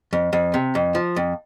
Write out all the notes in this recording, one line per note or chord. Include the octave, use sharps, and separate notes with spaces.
F2
F2
C3
F2
F3
F2